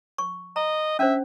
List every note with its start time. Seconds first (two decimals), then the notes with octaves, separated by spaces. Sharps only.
0.18 C#6
0.56 D#5 A#5
0.99 C#4 D4 C5 E5